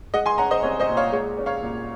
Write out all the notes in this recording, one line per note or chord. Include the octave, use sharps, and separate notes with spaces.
G#3 D#5 F#5
G#5 C6
C#4 F#5 A#5
C5 D#5
C2 C#5
C5 D#5
A#2
C#5 F5
G#3 C#5
C#4
C#5 F5
A#2